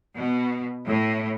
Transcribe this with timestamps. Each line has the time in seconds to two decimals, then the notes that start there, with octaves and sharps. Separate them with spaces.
0.16 B2
0.86 A2